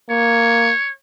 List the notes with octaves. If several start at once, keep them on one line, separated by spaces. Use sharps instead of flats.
A#3 C#5